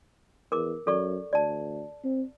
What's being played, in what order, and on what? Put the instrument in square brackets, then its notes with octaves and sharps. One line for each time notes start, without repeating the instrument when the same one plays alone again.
[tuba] E2 [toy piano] A#4 D6
[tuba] F#2 [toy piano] A4 D5 C#6
[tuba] D2 [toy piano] D5 A5
[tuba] C4